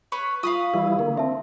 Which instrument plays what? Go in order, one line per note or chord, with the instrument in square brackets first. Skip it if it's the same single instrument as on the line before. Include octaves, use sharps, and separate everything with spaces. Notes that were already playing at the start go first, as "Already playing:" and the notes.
[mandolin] B4 C#5 B5
[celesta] F4 C#6 [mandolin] F5 B5 D#6
[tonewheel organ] E3 G3 E4
[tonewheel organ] D3 A#3 [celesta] A#4
[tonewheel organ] C4 [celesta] E5 A5